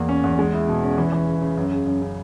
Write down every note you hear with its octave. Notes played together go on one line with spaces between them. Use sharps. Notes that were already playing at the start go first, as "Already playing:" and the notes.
Already playing: E2 A#3
C#4
E2
G#3
E4
B2
C#4
E3
E3
C#3
C#3
F#2
C#3
F#2
C#3